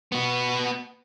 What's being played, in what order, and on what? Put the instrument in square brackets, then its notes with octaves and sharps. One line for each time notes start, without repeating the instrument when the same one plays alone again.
[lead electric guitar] B3 F#4